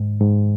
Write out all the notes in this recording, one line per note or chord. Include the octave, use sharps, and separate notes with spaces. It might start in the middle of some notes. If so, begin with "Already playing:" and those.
Already playing: G#2
G#2